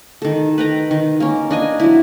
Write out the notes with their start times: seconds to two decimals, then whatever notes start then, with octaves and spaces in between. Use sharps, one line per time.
0.22 D#3 A4
0.58 B4 G5 A#5
0.91 D#3
1.20 A#3 C#4
1.51 D4 D#5 G#5
1.80 F#3 E4